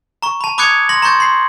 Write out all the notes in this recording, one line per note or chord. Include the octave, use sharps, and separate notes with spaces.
A#5 C#6
A5 B5
B5 D6 D#6 F#6 G#6 C#7
C6 A#6 F#7
A#5 C6 C#6 G6 A6
C6 C7